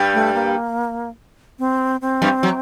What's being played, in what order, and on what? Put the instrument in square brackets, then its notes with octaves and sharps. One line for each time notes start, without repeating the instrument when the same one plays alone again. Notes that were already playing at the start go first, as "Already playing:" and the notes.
Already playing: [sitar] G2 G3
[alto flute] A3
A#3
C4
C4
[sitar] G2 G3
F#3